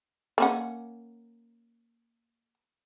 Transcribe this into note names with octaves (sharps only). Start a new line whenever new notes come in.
A#3 C#4 F#5